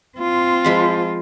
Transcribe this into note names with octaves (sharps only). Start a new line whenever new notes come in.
C4 F4
F3 G#3 B5